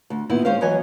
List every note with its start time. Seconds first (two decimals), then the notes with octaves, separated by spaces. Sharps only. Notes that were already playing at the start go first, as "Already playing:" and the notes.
0.10 D2
0.30 A#2 D#3 B3 E4
0.45 G#3 C#4 C5 F5
0.61 E3 F#3 C#5 D#5 G#5